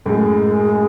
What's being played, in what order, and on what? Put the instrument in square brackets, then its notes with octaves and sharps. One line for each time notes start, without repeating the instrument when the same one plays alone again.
[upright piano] F#2 A2 [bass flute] G#3